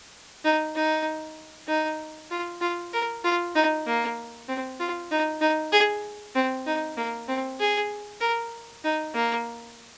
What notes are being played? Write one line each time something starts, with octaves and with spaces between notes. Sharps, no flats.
D#4
D#4
D#4
F4
F4
A#4
F4
D#4
A#3
C4
F4
D#4
D#4
G#4
C4
D#4
A#3
C4
G#4
A#4
D#4
A#3